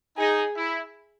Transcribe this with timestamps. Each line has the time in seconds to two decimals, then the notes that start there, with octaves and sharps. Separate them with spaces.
0.17 D#4 G#4
0.55 E4